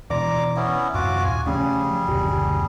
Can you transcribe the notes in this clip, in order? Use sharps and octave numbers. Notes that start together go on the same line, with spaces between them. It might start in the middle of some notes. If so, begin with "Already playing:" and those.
B2 E3 D5 A#5 C6 D6
B3 C#4 E4
F#2 A2 C3 F4 F#4 D6
D#1 G#5
C#3 F3 G3 A3 C#4 G#4
F#1 D2 B2 G4